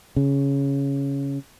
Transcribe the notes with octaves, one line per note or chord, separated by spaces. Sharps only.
C#3